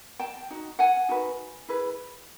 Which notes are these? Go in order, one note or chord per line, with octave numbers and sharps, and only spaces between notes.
G5 A5
D#4 F#4
F#5 G#5
D#4 F#4 B4
E4 G#4 B4